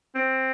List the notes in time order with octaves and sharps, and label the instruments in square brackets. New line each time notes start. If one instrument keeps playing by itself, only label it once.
[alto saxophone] C4